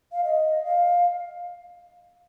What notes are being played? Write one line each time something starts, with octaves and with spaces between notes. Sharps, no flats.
F5
D#5
F5